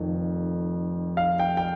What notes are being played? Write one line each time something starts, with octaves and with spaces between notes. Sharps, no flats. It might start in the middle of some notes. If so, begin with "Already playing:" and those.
Already playing: F1 F2 D#3
F5
G5
G5